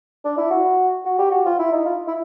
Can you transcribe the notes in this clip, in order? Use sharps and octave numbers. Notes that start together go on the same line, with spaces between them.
D4
E4
F#4
F#4
G4
F#4
F4
E4
D#4
F4
E4